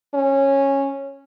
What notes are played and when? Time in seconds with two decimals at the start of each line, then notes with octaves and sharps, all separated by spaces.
0.14 C#4